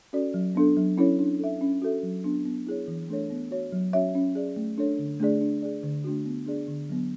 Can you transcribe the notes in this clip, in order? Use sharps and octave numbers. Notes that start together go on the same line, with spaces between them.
C#4 F#4 A4 D5
F#3
B3 D4 A4
F#3
C#4 E4 A4 C#5
D4
A4 E5
C#4
F#4 A4 E5
F#3
B3 D4
B3
E4 G#4 C#5
E3
A3 D4 A4 C#5
B3
F#4 C#5
F#3
C#4 F#4 C#5 E5
C#4
G#4 D5
A3
D4 A4 C#5
D3
A3 D4 G#4 D5
D4
G#4 D5
D3
A3 D4 F#4
B3
D4 G#4 D5
D3
F#3 B3